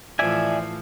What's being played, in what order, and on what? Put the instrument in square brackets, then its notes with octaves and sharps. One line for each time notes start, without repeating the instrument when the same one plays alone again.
[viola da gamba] A2 E3 F3 [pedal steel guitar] D5 E5 G#5